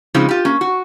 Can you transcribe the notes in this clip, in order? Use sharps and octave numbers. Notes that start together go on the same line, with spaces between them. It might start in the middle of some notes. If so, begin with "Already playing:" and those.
C#3 F3 G#3 C4 D#4
F4 G4
A#3 C#4
F#4